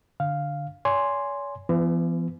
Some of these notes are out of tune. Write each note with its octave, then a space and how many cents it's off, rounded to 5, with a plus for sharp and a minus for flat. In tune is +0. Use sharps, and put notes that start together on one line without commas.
D3 +0 F5 +0
C#5 +40 G#5 +0 C6 +0
E3 +45 B3 +15